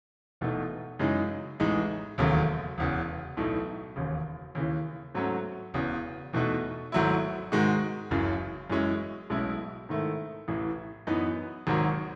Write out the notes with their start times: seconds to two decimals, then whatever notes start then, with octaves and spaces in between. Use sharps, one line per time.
0.41 E1 E2 B2 A3 D#4
0.99 F#2 C#3 E3 G#3 D#4
1.60 A1 A2 G#3 D#4
2.18 E1 D#2 C#3 F#3 A3
2.78 E1 E2 C#3
3.37 B1 A2 E3 A3 D#4
3.96 E1 D#2 C#3
4.55 D#2 C#3 E3
5.15 G#2 F#3 A3 C#4 F#4
5.74 E1 E2 C#3
6.33 E2 B2 A3 D#4 F#4
6.92 G#1 G#2 F#3 A3 E4
7.52 G#2 D#3 G#3 D#4 F#4
8.11 F#1 F#2 C#3 E3
8.70 F#2 E3 G#3 C#4 E4
9.30 B1 A2 G#3 C#4 E4
9.89 G#2 D#3 A3 E4
10.48 A1 A2 E3
11.07 F#2 E3 B3 D#4
11.67 G#1 G#2 D#3 F#3